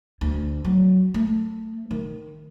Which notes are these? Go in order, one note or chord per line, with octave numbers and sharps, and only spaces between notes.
D2
F#3
A3
D#3